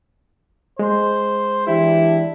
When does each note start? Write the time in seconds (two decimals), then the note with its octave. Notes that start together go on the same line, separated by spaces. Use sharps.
0.79 G#3 C5
1.67 E3 D4 E4 G4